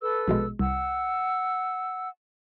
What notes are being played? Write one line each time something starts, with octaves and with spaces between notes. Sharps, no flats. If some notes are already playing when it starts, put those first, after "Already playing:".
A4 B4 E6
A#1 B2 G#3
C2 F#5 E6